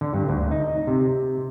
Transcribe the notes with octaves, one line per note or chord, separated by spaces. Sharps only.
D3
G2
D2
D#4
C3